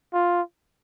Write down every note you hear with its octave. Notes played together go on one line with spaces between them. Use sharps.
F4